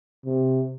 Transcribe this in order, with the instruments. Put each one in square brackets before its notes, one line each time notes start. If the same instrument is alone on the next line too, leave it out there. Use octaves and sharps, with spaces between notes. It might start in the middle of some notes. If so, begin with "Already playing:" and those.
[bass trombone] C3